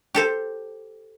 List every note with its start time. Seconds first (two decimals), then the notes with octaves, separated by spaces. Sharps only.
0.15 G4 A4 C5